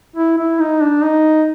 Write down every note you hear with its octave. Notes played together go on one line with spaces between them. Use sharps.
E4
E4
D#4
D4
D#4